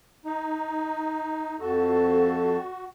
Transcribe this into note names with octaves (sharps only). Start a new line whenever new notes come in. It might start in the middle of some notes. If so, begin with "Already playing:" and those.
D#4
F2 F#4 A4